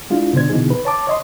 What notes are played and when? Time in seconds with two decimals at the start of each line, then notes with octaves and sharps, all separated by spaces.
0.10 G#3 D4 E4 F4
0.33 B2 D3 D4 C5 G#6
0.49 B2 D3 E3 D#4 G#4
0.70 B4
0.85 C#5 A5 D6
1.07 C#5 D#5 C6